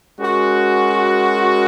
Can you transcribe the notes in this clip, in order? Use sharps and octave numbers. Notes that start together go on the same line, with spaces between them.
G#3 C#4 F#4 A#4